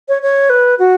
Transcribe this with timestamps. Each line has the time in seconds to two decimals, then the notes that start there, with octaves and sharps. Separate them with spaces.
0.09 C#5
0.22 C#5
0.50 B4
0.79 F#4